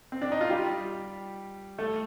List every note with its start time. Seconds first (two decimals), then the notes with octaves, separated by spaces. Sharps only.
0.12 C4
0.22 D4
0.32 D#4
0.41 F4
0.50 G3 G4
1.78 A3 A4